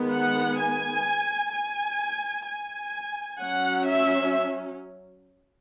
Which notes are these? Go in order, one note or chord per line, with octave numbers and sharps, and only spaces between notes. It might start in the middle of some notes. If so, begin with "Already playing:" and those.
Already playing: D#3 G#3 B3
F#5
G#5
G#5
G#5
F#3 C#4 F#5
E5